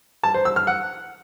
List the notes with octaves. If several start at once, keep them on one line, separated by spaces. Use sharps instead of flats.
A5
C5
E6
F6
F#5